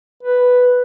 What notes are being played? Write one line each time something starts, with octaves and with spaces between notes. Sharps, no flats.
B4